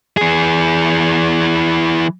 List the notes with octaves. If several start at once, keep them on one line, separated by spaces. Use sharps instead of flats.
E3 G#4